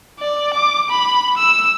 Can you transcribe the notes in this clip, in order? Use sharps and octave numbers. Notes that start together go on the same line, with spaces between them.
D5
D6
B5
E6